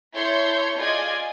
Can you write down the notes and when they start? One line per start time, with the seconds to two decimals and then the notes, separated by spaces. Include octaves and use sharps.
0.14 E4 A4 C#5 C6 G6 C#7
0.77 F4 G#4 D5 D#5 G#5 G#6